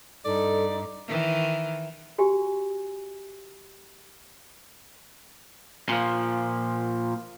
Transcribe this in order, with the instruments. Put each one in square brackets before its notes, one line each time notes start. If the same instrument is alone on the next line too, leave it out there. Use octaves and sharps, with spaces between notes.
[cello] G2 [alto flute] D#4 [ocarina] A4 [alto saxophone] D5
[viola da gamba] D#3 E3
[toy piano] F#4 G4 G#5
[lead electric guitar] A#2 F3